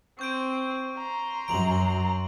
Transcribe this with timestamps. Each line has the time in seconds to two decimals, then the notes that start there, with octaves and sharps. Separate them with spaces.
0.19 C4 C#6 G6 D7
0.97 A#5 C6
1.48 F#2 D7 F7 F#7